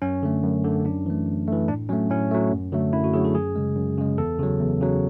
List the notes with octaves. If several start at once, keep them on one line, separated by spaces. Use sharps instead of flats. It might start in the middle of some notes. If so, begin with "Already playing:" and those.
F#2 C#4
D3 A3
F#2
D3 A3
F#2 D4
E3 A3
F#2
E3 A3
A2 D4
F#3 A3 C#4
A2 C#4
F#3 A3
F#2
D3 F#3 A3
F#2 E4
F#4
D3 F#3 A3 G#4
A4
F#2 G#4
C#3 G#3
F#2
C#3 G#3
E2 A4
C#3 F#3
E2
C#3 F#3